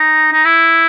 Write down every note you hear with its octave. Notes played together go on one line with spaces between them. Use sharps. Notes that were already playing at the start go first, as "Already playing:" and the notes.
Already playing: D#4
D#4
E4